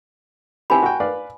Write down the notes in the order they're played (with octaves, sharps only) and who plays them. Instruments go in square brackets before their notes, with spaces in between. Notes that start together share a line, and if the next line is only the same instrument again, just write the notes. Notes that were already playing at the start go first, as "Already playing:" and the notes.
[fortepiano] C4 E4 G4 [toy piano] G#5 B5
[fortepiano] F#4 G5
B4 D5 F5